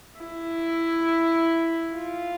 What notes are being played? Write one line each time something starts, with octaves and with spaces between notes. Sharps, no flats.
E4
F4